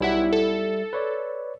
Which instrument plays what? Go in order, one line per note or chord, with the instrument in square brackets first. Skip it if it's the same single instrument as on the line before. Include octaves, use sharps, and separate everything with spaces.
[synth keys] B1 E4 F#5 [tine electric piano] G3 E5
[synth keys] A4
[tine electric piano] B4 C#5 D5